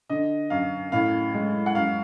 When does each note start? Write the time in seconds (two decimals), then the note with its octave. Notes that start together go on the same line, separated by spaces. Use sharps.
0.10 D3 D#5
0.50 F#2 F5
0.92 A2 F5
1.34 G#3
1.66 F#5
1.75 F#2 F5